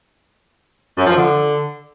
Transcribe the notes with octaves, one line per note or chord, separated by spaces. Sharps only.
F#2
F3
D3